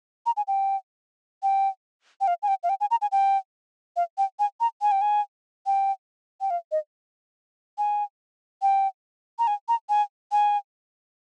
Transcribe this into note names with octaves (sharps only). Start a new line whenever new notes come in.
A#5
G#5
G5
G5
G5
F5
G#5
G5
F5
G5
G#5
A#5
G#5
G5
F5
G5
G#5
A#5
G#5
G5
G#5
G5
G5
F5
D#5
G#5
G5
A#5
G#5
A#5
G#5
G#5